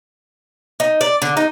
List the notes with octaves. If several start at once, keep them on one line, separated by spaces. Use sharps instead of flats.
D#4
D5
D3
D#4